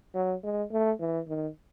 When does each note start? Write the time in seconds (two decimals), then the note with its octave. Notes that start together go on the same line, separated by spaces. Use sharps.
0.15 F#3
0.43 G#3
0.72 A3
1.00 E3
1.28 D#3